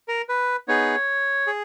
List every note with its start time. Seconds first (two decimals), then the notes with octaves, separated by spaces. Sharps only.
0.08 A#4
0.29 B4
0.68 B3 D#4 G#4 C#5
1.47 G#4